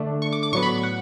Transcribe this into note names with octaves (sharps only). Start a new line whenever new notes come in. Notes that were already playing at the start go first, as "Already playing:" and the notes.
Already playing: D3 A3 D4
C#6
D6
D6
A2 F#3 B3 C#6
B5
F#5